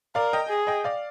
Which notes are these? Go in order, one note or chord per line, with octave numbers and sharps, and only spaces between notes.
A#4 D5 F5
D#5 G5
G#4
D#5 G5
D5 F5